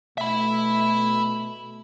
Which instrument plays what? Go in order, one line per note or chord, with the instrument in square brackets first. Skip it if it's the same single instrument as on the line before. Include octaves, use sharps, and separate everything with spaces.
[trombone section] B2 A3 [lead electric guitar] E5 B5